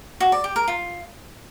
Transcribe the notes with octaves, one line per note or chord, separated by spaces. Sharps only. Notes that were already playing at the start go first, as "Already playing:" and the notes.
F#4
D5
G4
A#4
F4